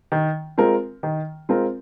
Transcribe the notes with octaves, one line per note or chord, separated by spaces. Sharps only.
D#3
G#3 C4 F4 A#4
D#3
G#3 C4 F4 A#4